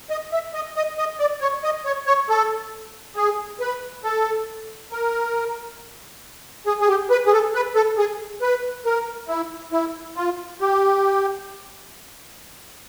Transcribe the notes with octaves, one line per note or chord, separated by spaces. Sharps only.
D#5
E5
D#5
D#5
D#5
D5
C#5
D#5
C#5
C#5
A4
G#4
B4
A4
A#4
G#4
G#4
G4
B4
G#4
A4
B4
A4
G#4
B4
A#4
E4
E4
F4
G4